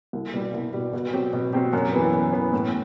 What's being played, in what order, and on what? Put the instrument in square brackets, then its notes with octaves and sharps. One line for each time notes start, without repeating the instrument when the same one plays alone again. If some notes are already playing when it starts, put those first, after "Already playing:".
[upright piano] C2
B2 G3
C2
B2 G3
B2
F#3 C4 G4
B2
F#3 C4 G4
F#2
E3 B3
F#2
E3 B3
A2